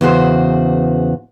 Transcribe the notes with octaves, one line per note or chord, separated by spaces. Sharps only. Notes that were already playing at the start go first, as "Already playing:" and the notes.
E2 C#3 F#4 C5